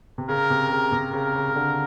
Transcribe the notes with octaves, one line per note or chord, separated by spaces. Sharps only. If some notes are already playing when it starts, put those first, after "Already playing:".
C3
C#3 A#4
C3
C#3
C3
C#3 A#4
C#3
C#3
D3